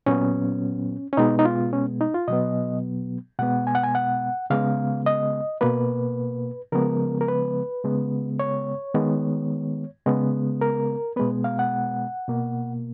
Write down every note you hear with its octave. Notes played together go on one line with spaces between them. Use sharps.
A#2 F#3 B3 C#4
C#4
B2 G#3 B3 D#4
D#4
F4
C#4
D#4
F4
B2 F#3 B3 D#5
B2 G#3 B3 F#5
G#5
F#5
G#5
F#5
C#3 G#3 B3 F5
D#5
B2 A#3 B4
C#3 F3 G#3 B3 A#4
A#4
B4
C#3 G#3 B3
C#5
D#3 G#3 B3
C#3 G#3 B3
A#4
B2 G#3 B3 B4
F5
F#5
B2 A#3